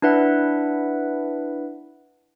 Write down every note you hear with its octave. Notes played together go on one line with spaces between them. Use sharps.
D4 E4 B4 E5 F#5